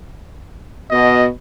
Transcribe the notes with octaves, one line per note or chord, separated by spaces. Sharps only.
B2 D#5